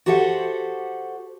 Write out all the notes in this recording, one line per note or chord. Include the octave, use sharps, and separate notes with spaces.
F#4 G4 A4 C5 F5 F#5